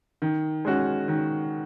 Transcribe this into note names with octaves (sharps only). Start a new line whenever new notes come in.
D#3
G#3 C#4 F#4
D#3